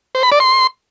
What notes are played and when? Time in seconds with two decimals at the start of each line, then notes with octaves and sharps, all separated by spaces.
0.15 C5
0.23 B5
0.32 D5
0.40 C6